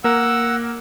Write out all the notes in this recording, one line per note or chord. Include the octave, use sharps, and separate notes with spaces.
A#3 A#4 F#5 E6